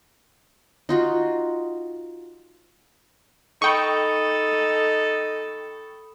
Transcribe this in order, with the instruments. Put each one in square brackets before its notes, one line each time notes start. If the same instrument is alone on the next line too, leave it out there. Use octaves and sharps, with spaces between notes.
[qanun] D#4 F4 F#4
[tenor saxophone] D#4 [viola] A4 [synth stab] G5 C#6 [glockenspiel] B5 D#6 C#7